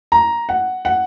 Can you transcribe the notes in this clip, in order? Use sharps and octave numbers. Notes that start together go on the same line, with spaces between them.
A#5
F#5
F#5